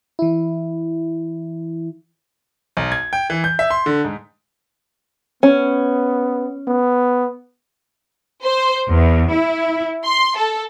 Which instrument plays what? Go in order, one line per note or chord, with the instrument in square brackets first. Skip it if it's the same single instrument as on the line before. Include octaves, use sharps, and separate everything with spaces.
[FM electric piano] E3 E4
[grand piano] B1
G#6
G5
E3
G6
E5
C6
D3
G#2
[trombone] B3 [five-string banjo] C#4
[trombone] B3
[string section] C5
E2
E4
C6
A4